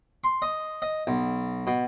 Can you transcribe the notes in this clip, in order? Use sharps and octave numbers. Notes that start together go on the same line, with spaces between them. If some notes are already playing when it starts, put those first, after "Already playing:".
C6
D#5
D#5
B1
B2